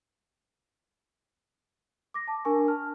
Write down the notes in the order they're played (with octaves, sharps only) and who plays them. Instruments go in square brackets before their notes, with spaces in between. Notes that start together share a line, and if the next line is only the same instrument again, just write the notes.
[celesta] D6 A#6
A5
D4 A#4 G#5 C#6
A5 F6